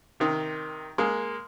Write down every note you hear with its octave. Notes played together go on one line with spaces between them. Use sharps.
C3 D#3
G#3 A#3